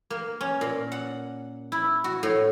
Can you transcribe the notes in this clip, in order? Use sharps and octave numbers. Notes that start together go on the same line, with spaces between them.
A#3
C#4
A#2
F#5
E4
F#4
A2